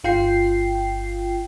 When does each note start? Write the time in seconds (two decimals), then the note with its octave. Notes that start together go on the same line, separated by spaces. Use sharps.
0.04 G1 F4 G5 C7